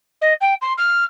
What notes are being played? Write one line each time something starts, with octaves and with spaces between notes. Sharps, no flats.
D#5
G5
C6
F6